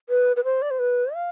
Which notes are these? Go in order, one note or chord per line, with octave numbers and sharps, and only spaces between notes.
B4
B4
C5
D5
C5
B4
F5